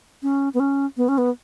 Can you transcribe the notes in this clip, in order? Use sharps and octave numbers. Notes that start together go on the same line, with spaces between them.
C#4
B3
C#4
B3
C#4
B3